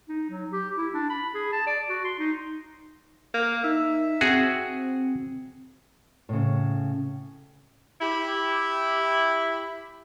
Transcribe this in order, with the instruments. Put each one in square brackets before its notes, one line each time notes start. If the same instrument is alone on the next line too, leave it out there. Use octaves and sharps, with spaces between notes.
[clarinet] D#4
F#3
G4
E4
D4
B5
G#4
A5
D5
F#4
C6
D#4
[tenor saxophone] A#3
[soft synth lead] D#4 [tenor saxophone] E5
[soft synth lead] C4 [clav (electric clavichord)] F#4 G#4
[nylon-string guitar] A2 C#3
[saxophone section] E4 G4